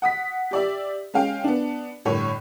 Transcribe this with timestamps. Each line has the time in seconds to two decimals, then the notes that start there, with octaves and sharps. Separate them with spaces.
0.02 F#5 D#6 B6
0.51 G4 D5 E5
1.14 G#3 C#4 F5 G5
1.44 B3 D4
2.05 G1 A2 C#5